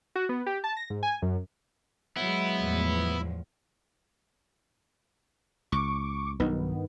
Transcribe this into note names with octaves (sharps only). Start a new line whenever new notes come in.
F#4
B3
G4
A5
A#6
G#2
G#5
F#2
F#3 G#3 B3 E4
E2 A2 F3
C#2 C#6 D6
B1 G2 D#3 B3